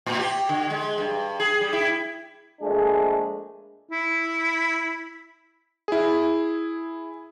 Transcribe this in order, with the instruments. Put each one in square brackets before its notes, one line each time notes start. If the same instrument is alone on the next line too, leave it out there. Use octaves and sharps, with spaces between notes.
[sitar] A2
G4
D3
G#3
G2
G#4
G3
E4
[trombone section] A#1 G#3 A3 D4 G#4
[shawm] E4
[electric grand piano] E4 G#4